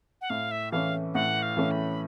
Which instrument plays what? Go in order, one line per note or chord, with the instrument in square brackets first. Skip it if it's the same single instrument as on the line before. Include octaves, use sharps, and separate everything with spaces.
[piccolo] F#5
[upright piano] A2 [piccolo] F5
[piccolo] E5
[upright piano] E3 A3 C#4 [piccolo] F5
[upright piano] A2 [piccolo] F#5
[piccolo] F5
[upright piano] E3 A3 C#4
[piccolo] B5